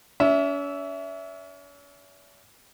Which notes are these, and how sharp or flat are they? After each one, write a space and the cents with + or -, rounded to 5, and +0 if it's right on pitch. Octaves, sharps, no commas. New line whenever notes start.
C#4 +40 E5 +0